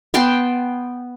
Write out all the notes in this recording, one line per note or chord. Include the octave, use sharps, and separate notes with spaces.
B3 G5 A5 C6